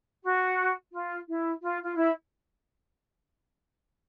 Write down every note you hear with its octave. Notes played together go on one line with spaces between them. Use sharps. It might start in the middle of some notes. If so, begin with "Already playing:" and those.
F#4
F4
E4
F4
F4
E4